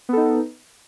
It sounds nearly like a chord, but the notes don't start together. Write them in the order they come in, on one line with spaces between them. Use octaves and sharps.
B3 A4 D#4